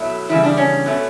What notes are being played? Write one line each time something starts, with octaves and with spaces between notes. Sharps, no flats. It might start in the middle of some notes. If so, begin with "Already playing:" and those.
Already playing: B2 F#3 A3 E4
E2 C#3 G3 E4
D4
C#4
B2 A3